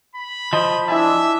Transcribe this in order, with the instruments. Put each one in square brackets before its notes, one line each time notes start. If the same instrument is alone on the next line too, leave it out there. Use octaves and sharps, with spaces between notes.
[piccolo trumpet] B5
[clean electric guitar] F3 [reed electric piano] D#5
[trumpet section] D4 D#5 [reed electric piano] E4 G#5 A5 [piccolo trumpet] E5